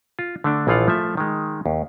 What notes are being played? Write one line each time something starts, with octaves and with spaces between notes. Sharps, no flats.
F4
D3 A3 D4
A#1 E3 F3 F4 F5 F#5
F3 A3 E5
D#3 G#3
D#2